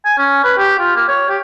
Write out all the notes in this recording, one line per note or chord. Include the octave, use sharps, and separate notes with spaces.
G#5
C#4
B4
G4
F4
A#3
C#5
G4